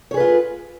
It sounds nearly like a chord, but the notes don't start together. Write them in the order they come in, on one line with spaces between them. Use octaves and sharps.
C#5 G#4 B4 F4